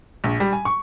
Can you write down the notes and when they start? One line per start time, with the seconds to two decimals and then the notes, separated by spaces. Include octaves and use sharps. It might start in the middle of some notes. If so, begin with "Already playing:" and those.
0.24 A#1
0.40 G3
0.53 G#5
0.65 C#6